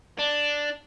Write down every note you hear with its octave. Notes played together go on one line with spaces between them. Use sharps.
D4